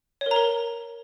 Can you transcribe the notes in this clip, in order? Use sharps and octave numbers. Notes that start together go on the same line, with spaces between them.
C#5
A#4
A#5
A#4